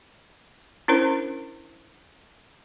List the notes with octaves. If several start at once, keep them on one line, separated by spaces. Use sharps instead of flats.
C#4 D4 E4 A#4 C5